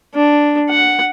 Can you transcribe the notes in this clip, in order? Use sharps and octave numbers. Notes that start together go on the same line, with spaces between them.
D4
F#5